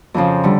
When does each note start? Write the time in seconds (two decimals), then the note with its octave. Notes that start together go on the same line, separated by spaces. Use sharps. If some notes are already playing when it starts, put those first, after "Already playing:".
0.14 F2 C#3 F3
0.44 D3 G3